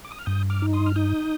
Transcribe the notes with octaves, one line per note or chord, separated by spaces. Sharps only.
D6
D#6
F6
G2 D#6 G6
D6 F6
D#4
C6 D#6
F6
D#4 D#6 G6